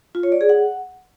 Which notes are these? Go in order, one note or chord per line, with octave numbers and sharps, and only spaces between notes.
F4
C#5
D5
G#4
F#5